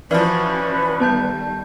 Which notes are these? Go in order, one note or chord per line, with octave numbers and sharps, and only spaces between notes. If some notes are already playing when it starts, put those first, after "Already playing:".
E3 F3 C#4 F#4 B4 D5 F6
D#3 G3 B3 A5 G6